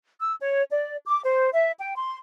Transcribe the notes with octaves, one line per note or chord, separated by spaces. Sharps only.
E6
C#5
D5
D6
C5
E5
G5
C6